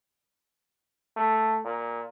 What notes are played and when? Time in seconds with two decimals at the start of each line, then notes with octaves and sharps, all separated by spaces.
1.17 A3
1.65 A#2